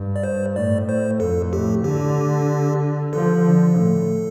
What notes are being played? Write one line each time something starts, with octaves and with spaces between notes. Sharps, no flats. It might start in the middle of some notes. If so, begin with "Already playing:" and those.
Already playing: G2
D5
C5
A2 D5
C5
F2 A4
A2 G4
D3 G4
F3 A4
D3
A2